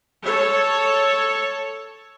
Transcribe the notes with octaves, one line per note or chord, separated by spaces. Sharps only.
A4 C#5